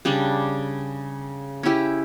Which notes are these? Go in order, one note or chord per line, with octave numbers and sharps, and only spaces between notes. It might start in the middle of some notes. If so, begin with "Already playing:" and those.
C#3 G3 D4
C#4 E4 G4